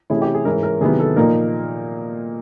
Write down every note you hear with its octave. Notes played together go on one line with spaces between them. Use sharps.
C3 E3 A3 C#4 E4 G#4
G4
G#4
G#2 E3 G#3 C#4 A#4
A#4
C3 D#3 F#3 B3 E4 G#4
A4
A#2 F3 A#3 D#4 A#4